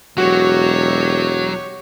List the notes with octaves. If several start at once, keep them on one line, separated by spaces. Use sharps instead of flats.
E1 F#3 F#4 G4 C#5